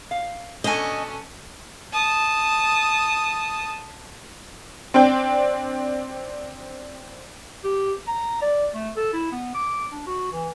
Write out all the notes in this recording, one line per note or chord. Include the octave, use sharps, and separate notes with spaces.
F5
B2 A3 C#4 D4 A4 D#5 G#5
A5 D#6
C4 D4 G5
G4
A#5
D5
A3
A4
E4
B3
D6
D4
F#4
E3